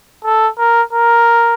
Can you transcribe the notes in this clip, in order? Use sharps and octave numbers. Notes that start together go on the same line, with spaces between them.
A4
A#4
A#4